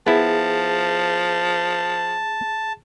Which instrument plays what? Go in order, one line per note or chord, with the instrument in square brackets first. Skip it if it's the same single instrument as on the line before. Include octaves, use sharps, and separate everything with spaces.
[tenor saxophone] F3 [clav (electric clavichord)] B3 E4 [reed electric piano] G#4 [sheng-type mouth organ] A5